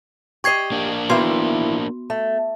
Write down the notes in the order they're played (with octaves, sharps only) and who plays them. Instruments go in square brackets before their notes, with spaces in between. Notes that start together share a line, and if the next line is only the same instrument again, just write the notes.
[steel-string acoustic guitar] G4 D#5 [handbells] C#6 G#6 C7
[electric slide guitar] A#3 D4
[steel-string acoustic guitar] D#3 E3 E4 [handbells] B3 F#4 C6
[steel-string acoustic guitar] A3